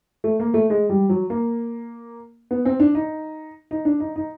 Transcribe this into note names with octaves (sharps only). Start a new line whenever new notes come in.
A3
A#3
A3
G#3
G3
F#3
A#3
B3
C4
D4
D#4
D#4
D4
D#4
D#4